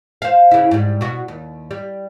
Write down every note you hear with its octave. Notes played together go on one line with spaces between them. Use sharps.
C5 F5
C#3 E4
G#2 G3
B2 F#4
D#2
G3